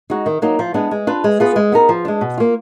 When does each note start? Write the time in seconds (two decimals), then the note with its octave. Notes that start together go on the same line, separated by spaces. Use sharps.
0.10 G#3 D#4 F#4
0.26 D#3
0.42 F#3 A#3 D#4
0.59 F3
0.74 G#3 B3 D4
0.91 G#3
1.07 D4 F4 B4
1.24 G#3
1.40 B3 F4 G#4 B4
1.56 G#3
1.72 B3 D#4 A#4
1.89 F3
2.05 G#3 D4
2.21 B2
2.38 A#3 F4